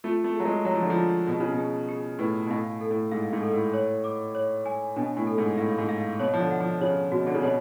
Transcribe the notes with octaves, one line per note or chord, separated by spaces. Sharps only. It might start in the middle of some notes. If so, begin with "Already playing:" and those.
A3 F4
A3
F#3 G#4
G#3
F#3 C#5
F3
D3
F3
F4
B2 G#4
C#3
B2
G#4
G#4
A2 B4
B2
A2 F5
A4
A2
G#2 F5
G#2
A4
A2
C#5
D6
C#5
G#5
B2 D4
A2
A4
G#2
A2 F5
G#2
F5
B2 C#5
F3
D3
F#5
F3
C#3 C#5
B2 F#4
D3
C#3
B2 C#5